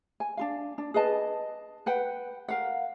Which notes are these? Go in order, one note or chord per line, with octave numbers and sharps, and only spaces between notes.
G#5
D4 F4 F5
D4
G#4 B4 D#5 A5
B4 F#5 G5
A#4 F5 F#5